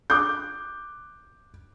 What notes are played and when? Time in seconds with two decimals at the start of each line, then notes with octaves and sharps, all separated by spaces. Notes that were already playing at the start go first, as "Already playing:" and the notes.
0.10 D6 F#6 G6